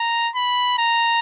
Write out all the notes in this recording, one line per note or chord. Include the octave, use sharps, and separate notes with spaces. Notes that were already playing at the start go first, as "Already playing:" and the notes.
Already playing: A#5
B5
A#5